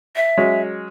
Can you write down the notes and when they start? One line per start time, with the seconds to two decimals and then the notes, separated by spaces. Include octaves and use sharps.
0.16 E5
0.37 F#3 G#3 C#4